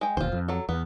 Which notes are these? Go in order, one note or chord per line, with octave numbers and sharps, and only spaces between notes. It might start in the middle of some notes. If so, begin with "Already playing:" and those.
G#3 G5
E1 D#2 F4 C5
F2
F#3 A4
E2 B3